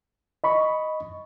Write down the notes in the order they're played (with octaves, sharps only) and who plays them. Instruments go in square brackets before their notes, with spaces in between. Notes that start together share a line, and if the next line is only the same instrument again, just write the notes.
[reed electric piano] D#5 B5 C#6